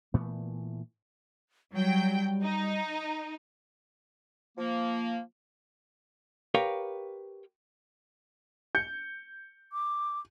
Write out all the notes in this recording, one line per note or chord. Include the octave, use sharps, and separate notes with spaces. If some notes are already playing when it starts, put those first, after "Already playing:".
A#2 E3 A3 B3
F#3 G3 G5
D#4
F3 A#3
G4 A#4 B4 C#5 F5 G5
G6 C#7
D6